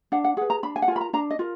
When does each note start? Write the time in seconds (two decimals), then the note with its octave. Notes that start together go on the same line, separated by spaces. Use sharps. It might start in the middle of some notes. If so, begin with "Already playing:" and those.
0.12 D4 F#5
0.24 F#5
0.37 G#4 F#5
0.41 B4
0.50 A#5
0.63 D4 B5
0.76 G#5
0.82 F#5
0.88 F4 G#5
0.92 A#4 B5
1.01 A#5
1.13 D4 A#5
1.30 D#5
1.39 F4 A#4